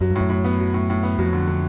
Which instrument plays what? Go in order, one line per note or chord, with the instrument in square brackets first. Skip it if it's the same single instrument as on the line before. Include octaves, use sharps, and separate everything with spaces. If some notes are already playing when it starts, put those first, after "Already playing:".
[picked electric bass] F#2 [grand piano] F#3
[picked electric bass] G2
[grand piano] A2
[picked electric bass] F#2
[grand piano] A2
B3
F#3
A2
A2
B3
[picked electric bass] F2 [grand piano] F#3
[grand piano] D3
D3